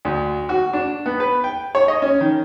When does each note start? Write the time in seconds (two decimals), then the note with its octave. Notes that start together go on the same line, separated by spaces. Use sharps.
0.05 D2
0.49 F#4
0.73 D4
1.06 B3
1.20 B4
1.44 G5
1.75 C#5
1.88 D#5
2.02 C#4
2.21 D#3